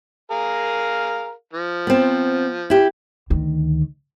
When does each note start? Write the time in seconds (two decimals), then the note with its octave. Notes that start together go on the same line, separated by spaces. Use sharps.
0.31 G#4 A#4 F5
1.53 F3
1.87 B3 C4
2.70 E4 G4
3.30 D2 D#3